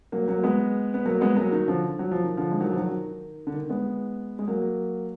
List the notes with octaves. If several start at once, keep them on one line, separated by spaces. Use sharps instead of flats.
F#3 A#3
F#3 A#3
G#3 B3
B3
F#3 A#3
G#3 B3
F#3 A#3
D#3 F#3
D3 F3
F#3
F3
D#3
D3 F3
G#3
D#3 F#3
F3
D#3 F#3
D#3
D3
D#3
G#3 B3
G#3
F#3 A#3